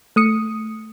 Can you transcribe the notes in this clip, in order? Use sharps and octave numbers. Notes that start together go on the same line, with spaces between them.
A3 D#6 C#7